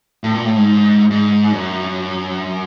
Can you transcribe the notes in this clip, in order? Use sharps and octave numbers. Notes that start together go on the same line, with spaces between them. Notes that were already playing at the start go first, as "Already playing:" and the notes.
A2
A#2
A2
G#2
G#2
F#2